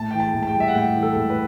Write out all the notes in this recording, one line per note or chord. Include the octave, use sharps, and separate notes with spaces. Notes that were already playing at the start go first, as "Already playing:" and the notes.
Already playing: A2 A5
E3 G5
A5
A2
A5
G5
G3
E5
F#5
A2 G5
E3
A4
A2
B4